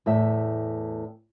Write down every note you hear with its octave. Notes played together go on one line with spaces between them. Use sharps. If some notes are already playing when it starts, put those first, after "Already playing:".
E2 A2 E5